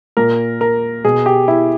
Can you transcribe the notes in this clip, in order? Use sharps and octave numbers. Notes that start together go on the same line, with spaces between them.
A#2 A#4
A#4
B2 G#4
G4
E4